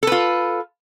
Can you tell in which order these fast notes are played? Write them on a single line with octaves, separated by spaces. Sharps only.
A4 B4 F4